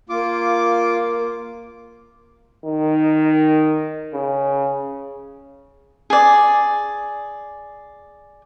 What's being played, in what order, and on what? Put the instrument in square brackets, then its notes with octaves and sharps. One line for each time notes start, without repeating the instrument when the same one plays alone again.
[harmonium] A#3 [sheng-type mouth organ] F4 D6
[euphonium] D#3
C#3
[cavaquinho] G#4 D5